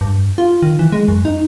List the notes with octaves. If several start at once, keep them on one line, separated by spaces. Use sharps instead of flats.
G2
F4
D#3
E3
G#3
F#2
D#4